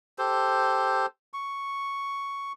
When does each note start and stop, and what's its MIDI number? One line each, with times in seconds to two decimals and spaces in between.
0.18 1.06 67
0.18 1.06 69
0.18 1.06 72
1.34 2.52 85